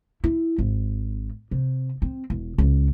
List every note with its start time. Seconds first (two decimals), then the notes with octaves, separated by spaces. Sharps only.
0.24 E4
0.58 G#1
1.51 C3
2.02 C4
2.30 E1
2.58 C#2